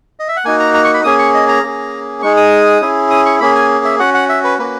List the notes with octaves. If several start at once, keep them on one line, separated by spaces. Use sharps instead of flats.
D#5
E5
F#5
A#3 D#4 F#4 G#5
A#5
A#5
C#6
B5
A#3 C#4 G#4 D#6
C#6
D#5
A#5
A#3 C#4 G#4
G#3 D#4 G#4 C#6
D#6
C#4 E4 G#4
D#6
C#6
A#3 C#4 G#4 B5
G#5
E5
C#4 F#4 F#5
F#5
E5
B4
A#3 C#4 F#4 B4